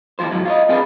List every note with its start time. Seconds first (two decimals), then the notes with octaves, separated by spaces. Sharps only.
0.19 D#2 D#3 E3 F4 C5
0.31 G#2 F#3 E4
0.45 F4 C#5 D#5
0.69 C4 D4 D#4 F4 G#4 B4